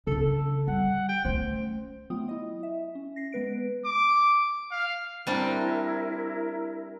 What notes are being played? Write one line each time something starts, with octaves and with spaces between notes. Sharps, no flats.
C#3 D4 A4
A4
G3 F#5
G5
A3 C#4 C5
F#3 A3 B3 F4 G5 D#6
E4 D#5
E5
C#4
A#6 C7
G#3 B3 B4 D7
D6
F5
G3 C4 D4 E4 A#4